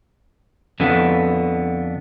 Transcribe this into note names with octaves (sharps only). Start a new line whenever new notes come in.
F2 D3 B3